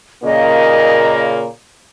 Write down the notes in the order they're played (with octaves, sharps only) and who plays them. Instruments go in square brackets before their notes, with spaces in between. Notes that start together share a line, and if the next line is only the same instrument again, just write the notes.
[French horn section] A#2 C#3 A#3 [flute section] D#5